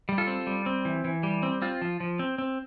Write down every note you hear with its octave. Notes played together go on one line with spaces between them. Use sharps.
G3
F4 A4
C4
G3
C4
E3
E3
G3
C4
C4 F4
F3
F3
C4
C4